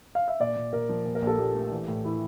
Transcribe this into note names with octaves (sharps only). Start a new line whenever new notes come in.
F5
E5
A#2 D5
A#2
A#2 A#4
F3
A#2
A#4
A#1
A4
A#1 G4
A3
E3
A2
E3 E4